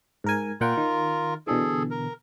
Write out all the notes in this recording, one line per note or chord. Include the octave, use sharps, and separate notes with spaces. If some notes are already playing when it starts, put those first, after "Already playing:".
G#2 A#4 G#5
A#2 F4 A#4 F#5 G5
D#3
B2 D3 E3 G#4 A4
A#4